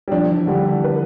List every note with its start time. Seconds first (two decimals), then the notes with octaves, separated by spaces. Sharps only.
0.08 G3
0.12 F3 D4
0.30 E3
0.47 D3 G3
0.66 E3
0.84 B4